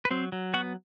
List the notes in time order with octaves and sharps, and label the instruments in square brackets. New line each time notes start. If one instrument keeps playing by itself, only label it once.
[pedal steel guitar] B4
F#3 C4 C5
F#3
B3 F#4 F#5